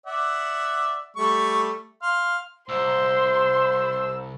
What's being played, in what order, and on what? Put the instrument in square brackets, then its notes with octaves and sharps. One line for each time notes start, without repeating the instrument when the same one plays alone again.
[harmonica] D5 E5 F#5
G3 A3 C#6
F5 C6
[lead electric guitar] C2 [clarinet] C5 [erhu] C6 [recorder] E6